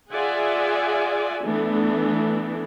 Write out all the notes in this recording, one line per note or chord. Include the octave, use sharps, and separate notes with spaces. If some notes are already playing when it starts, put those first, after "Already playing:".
F4 G#4 D5 E5 F#5 G#5
E3 A3 B3 D4